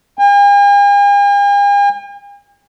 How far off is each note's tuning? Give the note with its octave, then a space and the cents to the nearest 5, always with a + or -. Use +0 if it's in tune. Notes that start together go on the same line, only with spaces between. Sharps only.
G#5 -45